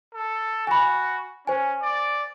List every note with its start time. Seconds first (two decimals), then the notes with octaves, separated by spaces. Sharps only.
0.14 A4
0.67 F#4 G#5 B5
1.47 C#4 C5 G#5
1.82 D5